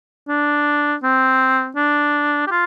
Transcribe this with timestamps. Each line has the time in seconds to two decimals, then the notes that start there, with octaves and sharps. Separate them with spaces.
0.28 D4
1.03 C4
1.76 D4
2.47 G4
2.51 F4